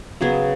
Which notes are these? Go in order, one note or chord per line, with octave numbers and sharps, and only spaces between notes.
C#3 F#3 B3 G#4